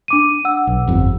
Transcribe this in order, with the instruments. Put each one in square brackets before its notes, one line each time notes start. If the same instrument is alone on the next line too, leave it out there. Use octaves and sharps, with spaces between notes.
[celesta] D4 D6 D#7
F#5 E6
[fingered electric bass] B1
G1 F2